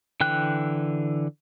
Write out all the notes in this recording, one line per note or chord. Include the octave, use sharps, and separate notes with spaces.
D3 E3 G5 F#6